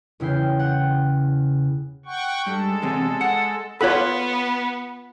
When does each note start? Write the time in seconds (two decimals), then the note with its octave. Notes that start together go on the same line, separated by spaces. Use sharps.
0.20 E2 C#3 E4 G5 C7
0.59 F#5 G5
2.05 F#5 G5 C#6
2.47 G2 G#3 A4
2.82 E2 C3
3.21 F#5
3.81 B3 F4 A4 C#5 F#5 B5